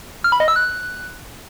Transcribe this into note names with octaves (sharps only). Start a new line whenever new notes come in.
F6
B5
D#5
E6
F#6